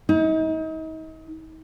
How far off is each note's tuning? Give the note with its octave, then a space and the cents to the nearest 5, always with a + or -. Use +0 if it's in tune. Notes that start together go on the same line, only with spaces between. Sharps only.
D#4 +35